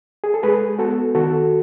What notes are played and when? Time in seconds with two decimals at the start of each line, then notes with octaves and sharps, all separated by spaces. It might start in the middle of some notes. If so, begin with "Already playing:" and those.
0.24 G#4
0.34 A4
0.43 G#3 G#4 B4
0.79 B3 F#4 A4
1.15 D#3 F#4 A4